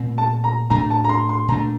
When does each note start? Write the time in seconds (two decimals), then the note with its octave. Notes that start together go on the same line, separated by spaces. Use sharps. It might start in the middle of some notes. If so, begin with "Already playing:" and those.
Already playing: A#2 A3 C4
0.18 A5
0.44 A#5
0.70 A2 A3 D4 A#5
0.90 A5
1.04 A#5
1.09 C6
1.29 C6
1.48 A#2 A3 D4 A#5